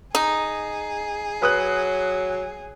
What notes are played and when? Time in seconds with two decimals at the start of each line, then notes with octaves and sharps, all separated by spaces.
0.15 D#4 G#4
1.42 F#3 B4 D#6 F#6